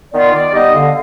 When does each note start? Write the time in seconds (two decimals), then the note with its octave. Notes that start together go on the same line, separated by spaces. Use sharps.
0.11 D#3 B3 F4 D5
0.32 D#3 D5
0.52 G3 B3 D#4 D#5
0.73 D3 F5